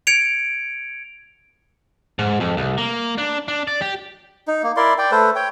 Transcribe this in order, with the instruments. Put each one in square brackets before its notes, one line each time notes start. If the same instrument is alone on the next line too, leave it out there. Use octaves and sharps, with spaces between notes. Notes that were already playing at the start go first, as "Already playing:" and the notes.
[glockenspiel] G#6 C#7 D7 F7
[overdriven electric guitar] G#2
F2
C2
A#3
D4
D4
D5
G4
[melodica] D#4
A#3
E4 A#4 D5 C6
D5 G5
A3 A4 B4 C5
C#5 G5